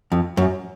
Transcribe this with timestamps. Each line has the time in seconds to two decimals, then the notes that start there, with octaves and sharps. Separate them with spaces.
0.12 F2
0.37 F#2